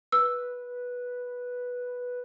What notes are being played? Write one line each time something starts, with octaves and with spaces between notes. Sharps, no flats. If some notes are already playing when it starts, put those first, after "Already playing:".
B4 E6